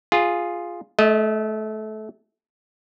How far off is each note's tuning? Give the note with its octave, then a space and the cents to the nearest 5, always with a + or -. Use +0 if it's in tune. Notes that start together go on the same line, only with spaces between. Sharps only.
F4 +0 G#4 -5
A3 -25 D#5 +15